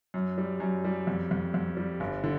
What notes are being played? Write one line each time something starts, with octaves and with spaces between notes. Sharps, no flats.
F#2
G3
F#2
G3
F2
F2
F2
G3
G1
D3